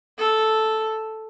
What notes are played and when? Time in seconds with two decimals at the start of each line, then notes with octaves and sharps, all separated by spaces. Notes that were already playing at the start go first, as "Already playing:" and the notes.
0.18 A4